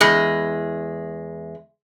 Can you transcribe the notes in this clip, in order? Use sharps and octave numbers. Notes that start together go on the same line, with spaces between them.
E2 G#3